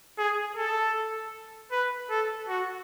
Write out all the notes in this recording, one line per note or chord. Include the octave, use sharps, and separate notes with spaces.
G#4
A4
B4
A4
F#4